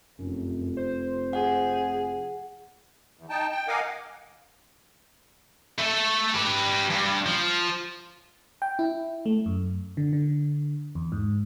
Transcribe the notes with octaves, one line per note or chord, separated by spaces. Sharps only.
F1 F#2
C5
G#4 F#5
E2
D#4 G5 A5
G5
A#4 D#5 F5 F#5 G#5 D6
A3 A4
G4 B4
G2
F3
G5
E4
A3
F#2
D3
D3
E2
G#2